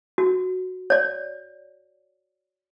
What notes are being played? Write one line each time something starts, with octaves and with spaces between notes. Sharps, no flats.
F#4
C#5 D5